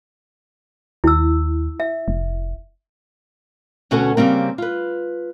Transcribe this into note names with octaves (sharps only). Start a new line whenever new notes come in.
D#2 E4 E6
E5
F1
D2 B2 C#4 F#4 A4 F#5
C#3 G3 A#3 C4
F4 B4